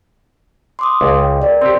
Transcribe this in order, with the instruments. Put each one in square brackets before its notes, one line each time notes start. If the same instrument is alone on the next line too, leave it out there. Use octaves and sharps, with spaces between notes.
[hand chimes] C6 D6 D#6
[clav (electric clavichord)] C#2
[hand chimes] G5
A#4 D5
[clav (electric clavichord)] C4 G4 [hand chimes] C6